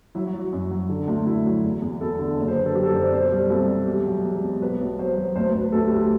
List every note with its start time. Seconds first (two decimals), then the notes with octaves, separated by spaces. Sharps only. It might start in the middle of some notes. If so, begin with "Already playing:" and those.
0.15 F#3 E4
0.27 F#4
0.33 F#3
0.40 F#4
0.53 F#2
0.71 F#3
0.90 D3
1.07 D2
1.26 D2 E4
1.46 F#3
1.64 E2
1.82 E2
2.01 E2 A4
2.19 D3
2.38 F#1
2.48 C5
2.56 D3 B4
2.66 A4
2.75 F#3 G4
2.84 A4
2.94 F#2 C5
3.03 D5
3.12 B2 C5
3.32 G3
3.50 C2 A4
3.68 B2
3.87 E1 G4
4.06 F#3
4.24 E1
4.43 B2
4.61 B1 B4
4.81 B1
4.99 F#3 C5
5.18 F#3
5.36 D2 C5
5.49 B4
5.54 D2
5.61 B4
5.72 D2 A4
5.86 G4
5.91 D2
5.98 G4